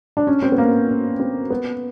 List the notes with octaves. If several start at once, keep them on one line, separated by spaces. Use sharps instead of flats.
D4
C#4
C4
B3
A#3
C#4
C4
B3